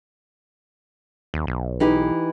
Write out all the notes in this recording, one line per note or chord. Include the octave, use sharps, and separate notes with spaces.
D#2
B1
E3 D#4 G4